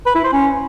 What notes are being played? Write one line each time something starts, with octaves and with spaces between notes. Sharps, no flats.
B4
E4
C5
C#4